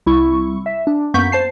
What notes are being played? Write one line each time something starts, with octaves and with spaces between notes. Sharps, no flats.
C2 E4 C#6
E5
D4
F#2 A#3 B3 C#6 G6 B6
C5 A5 C7